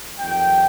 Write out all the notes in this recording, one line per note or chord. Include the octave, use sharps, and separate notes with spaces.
F2 D#3 G3 G5